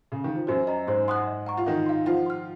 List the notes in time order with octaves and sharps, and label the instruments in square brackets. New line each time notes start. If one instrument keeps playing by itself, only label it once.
[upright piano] C#3
D#3
F3
[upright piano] F#2 F#3 [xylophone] C5
[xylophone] D#5 A#5
[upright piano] G#2 G#3 [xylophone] C5
[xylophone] F#5 C6 D#6 F#6
D#5
F#5 A#5 C#6
[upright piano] F4
[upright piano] D#3 D#4 [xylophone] A#4
[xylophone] F5 C6
[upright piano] F3 F4 [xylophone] F#5
[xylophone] C6 F6